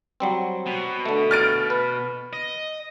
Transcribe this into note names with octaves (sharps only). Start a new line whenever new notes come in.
F#3 G3 C4
B2
D3 A3
F6 A6 D7
B4
D#5